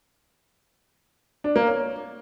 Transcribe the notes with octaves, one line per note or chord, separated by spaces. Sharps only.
D4
A#3
C#5